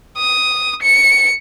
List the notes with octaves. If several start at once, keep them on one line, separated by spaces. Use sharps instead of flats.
D#6
C#7